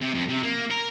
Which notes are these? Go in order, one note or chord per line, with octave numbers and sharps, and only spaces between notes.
C3
F2
C3
A#3
A#4